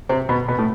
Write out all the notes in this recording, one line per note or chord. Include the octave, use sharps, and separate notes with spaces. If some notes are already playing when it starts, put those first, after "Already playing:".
C3 C4
B2 B3
B2 B3
A2 A3